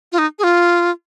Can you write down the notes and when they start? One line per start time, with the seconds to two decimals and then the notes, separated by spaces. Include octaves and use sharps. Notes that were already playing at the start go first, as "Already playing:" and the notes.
0.12 F4
0.18 D#4
0.39 G#4
0.44 F4